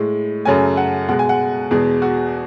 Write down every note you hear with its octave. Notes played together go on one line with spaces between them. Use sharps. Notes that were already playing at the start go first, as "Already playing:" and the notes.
Already playing: A2 G#3
F#2 C#3 F#3 A3 G#5
F#5
B2 G#3 F#5
G#5
F#5
E2 B2 G#3 G#4
F#4